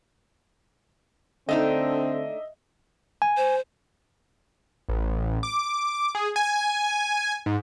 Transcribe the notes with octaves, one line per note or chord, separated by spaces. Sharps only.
D3 A3 C4 D4 D#4 D#5 E5
G#5
C5
A1
D6
G#4
G#5
G#2